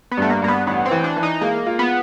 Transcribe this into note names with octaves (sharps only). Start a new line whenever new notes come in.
B3
G2 A3
A#3
G2 A#3
B3
A1 B3
C4
E3
D4
E3
D#4
G#3 A#3
F4
B3